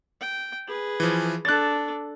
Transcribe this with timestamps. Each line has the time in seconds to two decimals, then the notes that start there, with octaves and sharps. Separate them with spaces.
0.20 G5
0.67 G#4 B4
1.00 E3 F3
1.45 D4 A4 F#6 A6